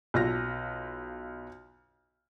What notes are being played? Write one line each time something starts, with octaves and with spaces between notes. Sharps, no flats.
B1 F4 F6 A#6